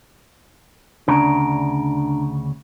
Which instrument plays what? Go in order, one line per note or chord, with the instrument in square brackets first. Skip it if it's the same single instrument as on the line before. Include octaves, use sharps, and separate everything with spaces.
[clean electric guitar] D2 C#3 [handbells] D4 A#5 D7